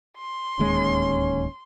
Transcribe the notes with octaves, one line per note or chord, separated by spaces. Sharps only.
C6
D1 D#2 G#3 C#4